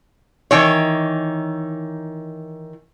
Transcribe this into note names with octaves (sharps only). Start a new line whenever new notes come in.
D#3 E3 C#5